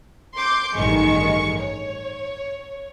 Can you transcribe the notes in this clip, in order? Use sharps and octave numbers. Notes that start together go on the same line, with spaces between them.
C6 D6 G6
A1 G2 D#3 G#3 C#6 C#7
C#5